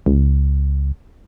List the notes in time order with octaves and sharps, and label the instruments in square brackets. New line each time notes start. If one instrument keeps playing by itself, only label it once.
[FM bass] C#2